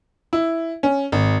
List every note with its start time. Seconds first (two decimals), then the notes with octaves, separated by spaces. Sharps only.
0.33 E4
0.83 C#4
1.12 G#1